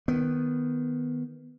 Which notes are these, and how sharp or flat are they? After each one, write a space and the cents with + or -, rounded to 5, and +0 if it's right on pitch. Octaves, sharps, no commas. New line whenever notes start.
D#3 +0 B3 +0